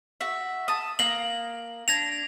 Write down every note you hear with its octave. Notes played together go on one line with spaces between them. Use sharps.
F#4 E5
A5 D#6
A#3 A#5 F#7
D4 G#6 A#6 F7